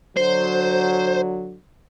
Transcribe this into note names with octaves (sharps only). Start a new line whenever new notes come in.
D3 F#3 C5